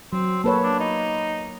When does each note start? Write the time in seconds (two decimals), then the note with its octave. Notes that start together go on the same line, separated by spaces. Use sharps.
0.13 F#3 C4
0.44 A#3 A4 B4 C#5
0.63 D4
0.80 D#4